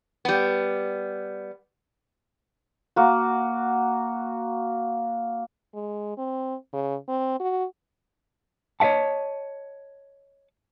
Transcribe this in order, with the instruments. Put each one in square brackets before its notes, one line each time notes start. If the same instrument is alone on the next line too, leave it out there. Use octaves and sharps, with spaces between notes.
[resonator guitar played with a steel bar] G3 B3
[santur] A#3 F#4
[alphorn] G#3
C4
C#3
C4
F#4
[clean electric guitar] C#5 D#5 E5 F#5 A5